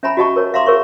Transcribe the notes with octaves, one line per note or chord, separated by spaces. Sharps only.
C#4 E5 G#5 A#5 B5
F#4 G4 D#5 F#5 A5 C#6
A#4 C#5
E5 F5 A#5 C6 D6
G#4 A#4 C#5 C#6